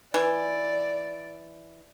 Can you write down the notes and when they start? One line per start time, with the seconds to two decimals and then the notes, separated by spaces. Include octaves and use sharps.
0.14 E3 D5